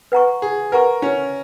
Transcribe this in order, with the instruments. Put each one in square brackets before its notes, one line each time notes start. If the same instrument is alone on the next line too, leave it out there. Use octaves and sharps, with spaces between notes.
[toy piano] B4 F#5 A#5 C#6
[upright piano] G#4
[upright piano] A#4 [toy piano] B4 F#5 A#5 C#6
[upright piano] C#4